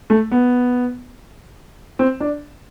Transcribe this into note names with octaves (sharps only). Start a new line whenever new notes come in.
A3
B3
C4
D4